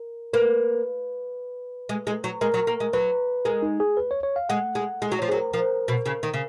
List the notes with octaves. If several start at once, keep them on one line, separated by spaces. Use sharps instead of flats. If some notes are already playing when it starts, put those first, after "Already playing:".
Already playing: A#4
A#3 B4
G#3
G#3
F#3
G#3 A#4
F#3
A#3
G#3
F#3 B4
G#3 A#4
D#4
G#4
B4
C#5
C#5
F5
G#3 F#5
G#3
G#3
F#3
F3 C#5
G#4
F#3
A#4
F3 A#4
B2
C#3
D#3
C#3